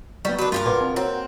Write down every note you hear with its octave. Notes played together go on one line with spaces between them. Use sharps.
F#3 G3 B3 C#6
A#2 D#3 D4 F#4 B4
G2 F4 G4 A#4
A#1 B4 F#5 C6 D6
A#3 C4
C4 F#4 A#4 C#5